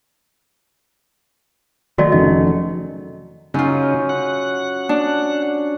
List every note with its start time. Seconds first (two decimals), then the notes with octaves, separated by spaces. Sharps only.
1.98 D#3 F#3 A3 F#4 D5 D#5
2.12 F1 C#3 D#5
3.54 F#2 C#3 C#4 D#4 F4
4.09 F#5
4.89 D4